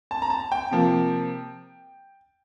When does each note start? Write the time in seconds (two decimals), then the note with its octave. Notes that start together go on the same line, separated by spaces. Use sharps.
0.11 A5
0.22 A#5
0.30 A5
0.52 G5
0.71 C3 F3 A#3